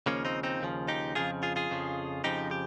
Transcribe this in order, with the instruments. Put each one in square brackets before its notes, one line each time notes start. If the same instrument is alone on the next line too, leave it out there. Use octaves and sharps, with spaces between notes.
[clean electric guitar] D#2 C#3 F3 A#3 C#4
C4 D#4
C4 D#4
D#2 C#3 F3
D#4 G4
F2 C#3 F3 F4 G#4
F4 G#4
F4 G#4
F2 C#3 F3
F2 C#3 F3 D#4 G4
G4